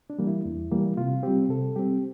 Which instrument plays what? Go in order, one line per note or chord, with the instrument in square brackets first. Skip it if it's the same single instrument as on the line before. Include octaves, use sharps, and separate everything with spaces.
[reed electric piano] D4
E3 G3 A#3
E4
E2
E3 G3 A#3
C3 F4
G3 C4 G4
C3 A4
G3 C4 G4